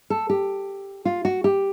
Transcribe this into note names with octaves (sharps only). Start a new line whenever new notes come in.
A4
G4
F4
F#4
G4